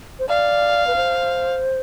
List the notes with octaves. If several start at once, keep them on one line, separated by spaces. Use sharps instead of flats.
C5
D5 F5
B4
C5